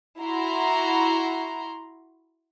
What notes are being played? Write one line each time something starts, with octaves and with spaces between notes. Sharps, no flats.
E4 F#4 A#5 C6